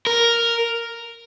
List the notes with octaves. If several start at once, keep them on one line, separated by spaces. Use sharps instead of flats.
A#4